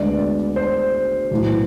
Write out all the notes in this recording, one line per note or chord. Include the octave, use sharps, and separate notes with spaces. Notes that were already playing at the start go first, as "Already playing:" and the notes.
Already playing: D2 D3 G#3 B3 D5
D5
C5
B1 A2 E3